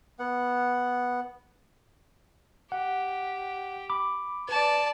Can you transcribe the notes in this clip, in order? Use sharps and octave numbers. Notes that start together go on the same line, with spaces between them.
B3 F#5
G4 F#5
B5 D6
B4 D5 A5